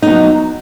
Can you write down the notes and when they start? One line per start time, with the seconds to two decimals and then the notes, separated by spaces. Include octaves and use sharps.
0.02 D#4
0.06 B3
0.10 F#3